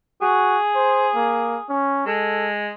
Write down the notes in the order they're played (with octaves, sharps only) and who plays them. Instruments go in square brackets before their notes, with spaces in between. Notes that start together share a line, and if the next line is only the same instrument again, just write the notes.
[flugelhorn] F#4 [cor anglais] G#4
[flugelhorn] C5
A#3
C#4
[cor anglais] G#3 [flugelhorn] A4